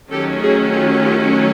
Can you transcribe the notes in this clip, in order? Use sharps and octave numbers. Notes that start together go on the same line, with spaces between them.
D#3 F#3 A3 C#4 G4 A4
F#4 G#4
F4 G4
F4 G4